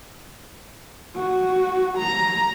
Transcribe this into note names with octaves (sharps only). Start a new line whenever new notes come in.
F#4
A#5